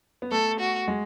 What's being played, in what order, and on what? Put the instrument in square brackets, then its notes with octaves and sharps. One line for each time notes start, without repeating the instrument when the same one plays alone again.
[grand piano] B3
[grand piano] A3 [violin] A4
[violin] F#4
[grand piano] G#3